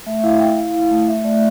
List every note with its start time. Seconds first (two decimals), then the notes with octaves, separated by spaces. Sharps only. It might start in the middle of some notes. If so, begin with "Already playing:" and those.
0.07 A3 E5
0.17 E5
0.24 E4 F5
0.40 E4 G5
0.57 E4 F5
0.74 E4
0.91 A3
1.08 A3 E5
1.24 A3 D5